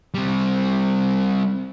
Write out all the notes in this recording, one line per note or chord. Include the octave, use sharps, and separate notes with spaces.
G3 C4